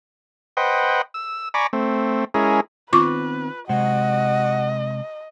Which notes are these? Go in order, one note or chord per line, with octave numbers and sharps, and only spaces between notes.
B4 C5 D#5 F#5 G5
E6
D5 G#5 A#5 B5 C#6 D6
A3 C4
G#3 C#4 E4 G#4 A#4
D#3 B3 C4 F4 B4 C#6 D6
C3 G#3 F#4 C5 D#5